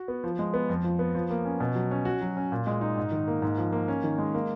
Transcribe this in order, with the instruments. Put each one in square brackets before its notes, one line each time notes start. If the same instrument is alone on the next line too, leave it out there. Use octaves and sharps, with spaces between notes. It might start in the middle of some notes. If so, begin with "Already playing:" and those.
Already playing: [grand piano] F#4
B3
F3
G#3
B3
F2
F3
B3
F3
A#3
C#4
B2
F#3
C#4
F#4
F#3
C#4
A#2
G#3
D#4
G#2
D#3
A#3
G#2
F3
A#3
C#4
D#3
G#3
A#3